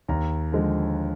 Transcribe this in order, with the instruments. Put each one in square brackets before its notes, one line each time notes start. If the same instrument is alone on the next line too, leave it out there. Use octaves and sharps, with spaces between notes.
[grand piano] D#2 A#5
D3 F3 G#3